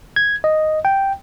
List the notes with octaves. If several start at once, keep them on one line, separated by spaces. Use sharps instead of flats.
G#6
D#5
G5